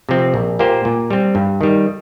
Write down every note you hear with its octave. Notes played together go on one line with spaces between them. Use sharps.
C3 F3 C4
A#1
A#2 A#3 G4 C5
A#2
G3 C4
G2
D#3 G3